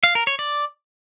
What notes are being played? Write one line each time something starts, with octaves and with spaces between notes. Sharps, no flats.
F5
A#4
C#5
D5